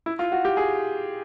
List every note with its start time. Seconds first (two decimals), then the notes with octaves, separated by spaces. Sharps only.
0.06 E4
0.19 F4
0.32 F#4
0.45 G4
0.57 G#4